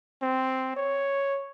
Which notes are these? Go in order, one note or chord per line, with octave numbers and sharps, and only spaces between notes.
C4
C#5